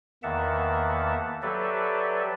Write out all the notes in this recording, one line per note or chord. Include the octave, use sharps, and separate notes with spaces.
E2 D#3 A#3 E5 F#5 A5
F#3 G4 A4 B4 D5 E5